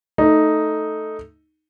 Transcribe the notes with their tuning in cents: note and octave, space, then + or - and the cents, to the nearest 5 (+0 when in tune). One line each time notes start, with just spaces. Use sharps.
A3 +0 D#4 +0